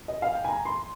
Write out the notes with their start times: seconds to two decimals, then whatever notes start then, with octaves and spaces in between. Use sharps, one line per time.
0.08 D#5
0.22 F5
0.33 G5
0.44 G#5
0.48 A#5
0.65 C6